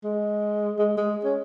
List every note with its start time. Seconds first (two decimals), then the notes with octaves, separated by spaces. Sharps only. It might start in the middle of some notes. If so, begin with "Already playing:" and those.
0.04 G#3
0.79 G#3
0.97 G#3
1.25 C#4